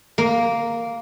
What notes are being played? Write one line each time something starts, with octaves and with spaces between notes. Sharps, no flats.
A#3